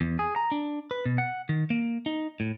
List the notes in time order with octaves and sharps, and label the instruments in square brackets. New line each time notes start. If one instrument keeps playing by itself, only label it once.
[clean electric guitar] E2
G#4
A#5
D4
B4
B2
F#5
D#3
A#3
D#4
A2